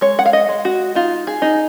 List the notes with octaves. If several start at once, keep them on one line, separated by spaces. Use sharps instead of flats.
G#3 C#5
F#5
F5
D#5
G#3
F#4
D#4 F4
G#4
D#4